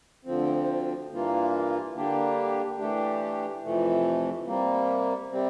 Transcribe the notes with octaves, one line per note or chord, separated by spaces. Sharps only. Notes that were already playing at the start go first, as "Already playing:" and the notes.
D2 D3 F3 C4
G2 E3 A#3 F4
D3 G3 A#3 D4 G4
E3 A3 D4 G4
F2 C3 E3 A3
C3 G3 A#3
C3 G3 C4